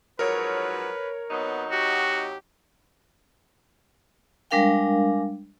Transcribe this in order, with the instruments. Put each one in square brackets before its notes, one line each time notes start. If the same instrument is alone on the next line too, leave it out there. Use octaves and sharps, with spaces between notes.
[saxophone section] G#2 F3 F#3 [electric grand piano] A#4 C#5 [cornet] B4
[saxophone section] C3 F#3 D#4 [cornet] B3
[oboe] F#4 [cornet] G4
[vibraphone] G3 G#3 D4 A#4 F5 G5